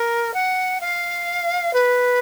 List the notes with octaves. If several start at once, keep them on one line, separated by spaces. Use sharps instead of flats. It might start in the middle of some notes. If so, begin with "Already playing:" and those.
Already playing: A#4
F#5
F5
B4